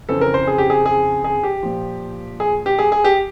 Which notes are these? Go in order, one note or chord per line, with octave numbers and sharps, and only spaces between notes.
F2 C#3 E3 A4
A#4
C5
G#4
G4
G#4
G#4
G#4
G4
A#2 F3
G#4
G4
G#4
G#4
G4